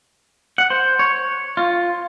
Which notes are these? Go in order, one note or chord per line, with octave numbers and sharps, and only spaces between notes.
F#5
C5
C#5
F4